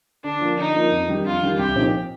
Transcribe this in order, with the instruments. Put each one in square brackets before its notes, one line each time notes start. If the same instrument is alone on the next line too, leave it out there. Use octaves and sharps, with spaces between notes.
[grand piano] D3 [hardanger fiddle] D4
[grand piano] F3 A#3 F4
[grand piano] D3 [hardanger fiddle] D#4
[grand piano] F3 A#3 F4
F2
D#3 G3 D4 G4
[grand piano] F2 [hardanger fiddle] F4
[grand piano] D#3 G3 D4 G4
[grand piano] C2 [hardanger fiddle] G4
[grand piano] A#2 F3 C4 D#4